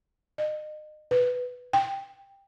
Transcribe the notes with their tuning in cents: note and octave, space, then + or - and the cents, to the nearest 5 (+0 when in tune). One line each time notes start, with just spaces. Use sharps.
D#5 -35
B4 +5
G5 +10